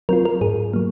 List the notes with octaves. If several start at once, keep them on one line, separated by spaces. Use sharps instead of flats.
F#3 C4 F4 A#4
A#4
G#2 G#4
F#3 A#3